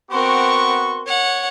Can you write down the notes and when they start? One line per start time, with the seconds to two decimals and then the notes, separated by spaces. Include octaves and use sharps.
0.11 B3 C4 F#4 A#4 C6 C#6
1.07 C#5 F#5